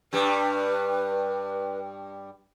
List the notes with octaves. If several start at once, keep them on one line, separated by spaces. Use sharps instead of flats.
G2 G3 D4 B4